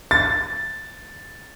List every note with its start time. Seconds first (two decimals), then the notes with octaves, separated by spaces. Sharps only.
0.11 A6